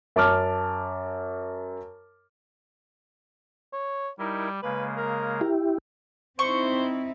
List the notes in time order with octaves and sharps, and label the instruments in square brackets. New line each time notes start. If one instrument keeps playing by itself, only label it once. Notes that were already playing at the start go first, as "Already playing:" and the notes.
[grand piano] F#2 A5 D6 F6
[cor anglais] C#5
[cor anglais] G3 [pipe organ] D#4 E4 A#4
[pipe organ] C#3 G#3 A#3 [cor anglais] B4
[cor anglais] A#4
[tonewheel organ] E4 G4
[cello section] C4 D#4 E4 [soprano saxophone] C5 [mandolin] C#6